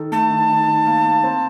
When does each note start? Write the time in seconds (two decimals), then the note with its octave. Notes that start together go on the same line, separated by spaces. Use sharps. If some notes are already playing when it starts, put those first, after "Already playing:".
Already playing: D#3 A4
0.12 A3 A5
0.30 D#3
0.50 D#3
0.68 D#3
0.86 A#3
1.05 A#3
1.24 C4